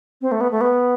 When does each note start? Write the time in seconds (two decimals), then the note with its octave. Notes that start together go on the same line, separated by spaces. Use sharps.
0.21 C4
0.32 A3
0.41 B3
0.51 A3
0.61 B3